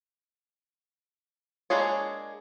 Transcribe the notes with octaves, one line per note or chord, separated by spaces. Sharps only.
G#3 A#3 D4 G#4 C#5